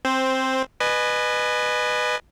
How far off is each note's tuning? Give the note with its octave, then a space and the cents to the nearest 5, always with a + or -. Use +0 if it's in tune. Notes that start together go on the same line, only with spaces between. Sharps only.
C4 +10 C5 +0
B4 +0 D#5 -35 G#5 +15